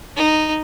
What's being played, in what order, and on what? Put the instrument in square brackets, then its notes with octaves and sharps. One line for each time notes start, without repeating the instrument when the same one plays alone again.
[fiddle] D#4